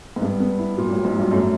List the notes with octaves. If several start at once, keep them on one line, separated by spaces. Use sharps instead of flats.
G#2
G2 B3
B3
E4
A#2 F#3
A2 F#3
G#2
G2 F#3
F#2 A3